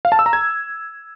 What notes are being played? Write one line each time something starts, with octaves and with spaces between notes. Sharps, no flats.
F5
A5
E6
A#5
G#6